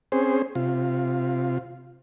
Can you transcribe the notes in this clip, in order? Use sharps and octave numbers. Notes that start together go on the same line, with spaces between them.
C4 C#4 G#4 C5
C3 F4